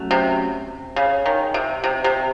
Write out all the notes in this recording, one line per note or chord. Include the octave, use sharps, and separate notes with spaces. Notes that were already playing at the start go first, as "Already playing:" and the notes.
Already playing: F#3 A3 C#4
C3
C#3
D#3
C3
C3
C3